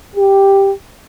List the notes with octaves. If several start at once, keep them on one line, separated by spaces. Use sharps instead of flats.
G4